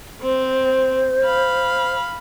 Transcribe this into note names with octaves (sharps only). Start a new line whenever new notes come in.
C4 C5
F5 B5